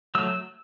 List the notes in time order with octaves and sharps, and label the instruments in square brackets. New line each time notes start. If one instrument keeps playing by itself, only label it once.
[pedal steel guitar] F#3 A3 E6